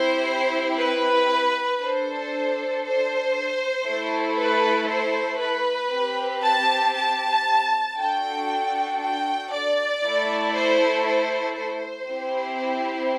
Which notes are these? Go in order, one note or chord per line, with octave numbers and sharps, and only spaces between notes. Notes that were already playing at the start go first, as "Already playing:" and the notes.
Already playing: C4 E4 G4 C5
B4
D4 A4 C5
C5
A3 E4 A4
B4
C5
B4
C4 G4
A5
A5
D4 F#4 A4 G5
G5
D5
A3 E4 A4
C5
C5
C5
C4 E4 G4